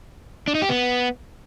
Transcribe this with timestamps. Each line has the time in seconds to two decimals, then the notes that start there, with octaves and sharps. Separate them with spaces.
0.48 D4
0.55 D#4
0.62 G4
0.69 B3